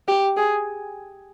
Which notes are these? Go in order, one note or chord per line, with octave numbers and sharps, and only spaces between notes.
G4
G#4